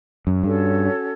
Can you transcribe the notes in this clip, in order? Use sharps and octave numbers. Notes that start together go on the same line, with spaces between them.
F#2
G2 C#4 F#4 A4 C#5